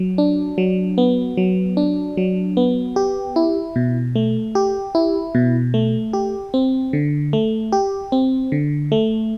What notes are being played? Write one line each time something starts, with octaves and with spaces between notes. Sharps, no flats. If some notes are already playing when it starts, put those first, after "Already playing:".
Already playing: F#3
D4
F#3
B3
F#3
D4
F#3
B3
G4
E4
B2
A3
G4
E4
B2
A3
G4
C4
D3
A3
G4
C4
D3
A3